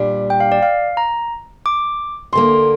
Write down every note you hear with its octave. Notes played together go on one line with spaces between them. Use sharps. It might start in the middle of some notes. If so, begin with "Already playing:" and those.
Already playing: A#2 G3 D4
G5
F5
D5
F5
A#5
D6
D2 D3 A#3 C6